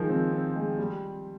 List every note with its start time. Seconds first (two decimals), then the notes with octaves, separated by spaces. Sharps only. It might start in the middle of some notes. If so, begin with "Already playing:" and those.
Already playing: D#3 F3 G#3
0.09 C4
0.32 C4
0.56 G#3
0.78 G3